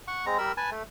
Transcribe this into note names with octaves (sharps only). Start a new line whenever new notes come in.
F#5 C#6
G#3 C4 A#5
G3 A#4 B5 E6
B4 G#5 A5
A3